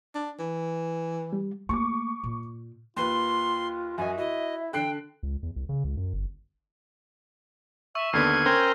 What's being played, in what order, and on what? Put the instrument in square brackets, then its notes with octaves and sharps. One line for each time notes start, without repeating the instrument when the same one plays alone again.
[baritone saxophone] D4
E3
[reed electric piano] G3
[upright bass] A3 A#3 [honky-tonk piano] C#6 D6
[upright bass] A#2
[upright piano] D#2 B4 [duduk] F4 [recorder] C6
[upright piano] F#2 D#5 [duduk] F#4 [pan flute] E5 [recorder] G#5
[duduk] E4 [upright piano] F#4 [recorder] D#5
[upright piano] D3 F#6 C7 [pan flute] D4 [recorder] G5
[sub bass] C#2
E2
C2
C#3
C#2
F#2
G1
[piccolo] E5 [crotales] C#6 E6
[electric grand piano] D#2 D3 B3 [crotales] F6 C7 [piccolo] G#6
[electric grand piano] C#4 [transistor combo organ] A#4 C5 G5